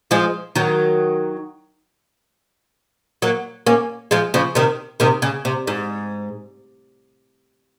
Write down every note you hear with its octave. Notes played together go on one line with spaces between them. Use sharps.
F3 G#3
D#3 F#3
F#3 A#3
A#3 C#4
F3 G#3
C#3 F3
C3 D#3
C3 D#3
C#3
C3
G#2